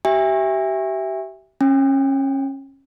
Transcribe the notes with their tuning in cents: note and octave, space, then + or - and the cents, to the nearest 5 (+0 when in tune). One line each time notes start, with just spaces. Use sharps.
G4 -35 E5 +0 G#5 -40
C#4 -25 G5 +40